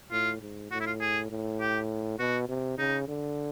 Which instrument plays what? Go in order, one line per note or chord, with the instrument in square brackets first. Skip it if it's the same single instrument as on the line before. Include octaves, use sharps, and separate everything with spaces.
[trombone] A2 [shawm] F4
[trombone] G#2
[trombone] A2 [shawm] F#4
[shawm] E4
F4
G#4
[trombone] A2
[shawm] G4
[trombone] B2 [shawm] F#4
[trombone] C3
[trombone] C#3 [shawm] D#4
[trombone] D3